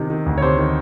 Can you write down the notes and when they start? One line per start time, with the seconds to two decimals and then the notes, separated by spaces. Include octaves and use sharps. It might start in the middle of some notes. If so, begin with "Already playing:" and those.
Already playing: C3 D#3
0.10 D#3
0.26 D2
0.38 C#5
0.42 C3 C5
0.58 D#3